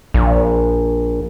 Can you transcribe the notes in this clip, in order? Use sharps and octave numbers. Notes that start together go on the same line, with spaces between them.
A#1